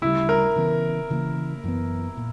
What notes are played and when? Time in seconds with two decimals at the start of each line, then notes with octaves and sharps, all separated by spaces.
0.02 D2 C#3 G3 E4
0.29 A#4
0.56 C#3 E3 B3
1.10 C#3 E3 A#3
1.64 F#2 E3 B3
2.17 A#2